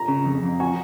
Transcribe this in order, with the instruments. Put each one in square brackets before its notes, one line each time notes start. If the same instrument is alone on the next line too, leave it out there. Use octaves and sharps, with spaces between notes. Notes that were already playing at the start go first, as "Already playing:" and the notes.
Already playing: [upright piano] A#5
[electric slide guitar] C#3
F2
F2
[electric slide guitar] F#4 [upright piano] G#5